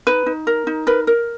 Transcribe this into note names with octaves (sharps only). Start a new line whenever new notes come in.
D#4 B4
D#4
A#4
D#4
A#4 B4
A#4